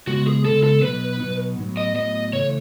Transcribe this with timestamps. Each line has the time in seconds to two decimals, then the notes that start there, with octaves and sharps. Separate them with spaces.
0.07 C#3 G#3 B3 F#4
0.27 G#4
0.45 C#3 G#3 B3 A4
0.64 A4
0.82 B2 F#3 B3 D#4 B4
1.20 B2 F#3 B3 D#4
1.58 A2 F#3 B3
1.77 D#5
1.96 A2 F#3 B3 D#5
2.33 C#3 E3 A3 C#5